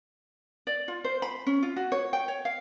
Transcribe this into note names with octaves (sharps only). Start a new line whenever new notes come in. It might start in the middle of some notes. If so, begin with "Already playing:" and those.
D5
F4
C5
B5
C#4
F4
F#4
C#5
G5
C#5
F5